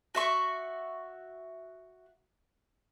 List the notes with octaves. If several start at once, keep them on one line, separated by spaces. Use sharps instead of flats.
F#4 E5 C#6